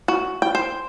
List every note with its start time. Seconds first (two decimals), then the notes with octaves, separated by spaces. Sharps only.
0.08 F#4
0.42 G5
0.55 C5